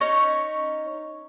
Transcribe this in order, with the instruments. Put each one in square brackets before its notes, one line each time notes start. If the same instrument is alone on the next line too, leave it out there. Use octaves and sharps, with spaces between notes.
[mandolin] C#4 D#4 C#5